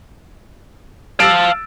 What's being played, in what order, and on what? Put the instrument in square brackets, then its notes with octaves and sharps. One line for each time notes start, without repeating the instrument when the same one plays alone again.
[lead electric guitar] F5 A5 [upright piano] E6 A6 D7